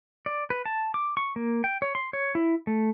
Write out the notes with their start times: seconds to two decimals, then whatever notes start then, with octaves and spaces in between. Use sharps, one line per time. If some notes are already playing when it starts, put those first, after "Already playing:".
0.26 D5
0.50 B4
0.66 A5
0.94 D6
1.17 C#6
1.36 A#3
1.64 G5
1.82 C#5
1.95 C6
2.13 C#5
2.35 E4
2.67 A3